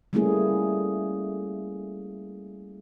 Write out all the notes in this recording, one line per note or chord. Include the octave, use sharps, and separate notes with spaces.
G3 A3 A#3 C#4 E4 G#4